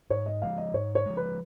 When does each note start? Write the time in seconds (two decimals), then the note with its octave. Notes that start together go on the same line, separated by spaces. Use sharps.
0.10 G#2 C#5
0.26 D#5
0.42 F3 G#3 F5
0.58 D#5
0.74 G#2 C#5
0.95 C#5
1.06 F3 G#3
1.17 B4